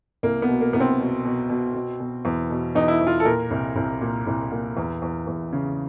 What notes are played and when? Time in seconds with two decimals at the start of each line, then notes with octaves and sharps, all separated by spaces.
0.23 C2 A#3
0.42 B3
0.49 B2
0.61 A#3
0.73 C2 B3
0.80 C4
1.00 B2
1.25 B2
1.49 B2
1.74 B2
2.00 B2
2.25 E2
2.50 B2
2.75 E2 D#4
2.88 E4
3.01 E2
3.07 F4
3.20 A4
3.25 A#2 A#4
3.51 C2
3.76 C2
4.01 A#2
4.27 C2
4.51 A#2
4.77 E2
5.02 E2
5.27 E2
5.53 C#3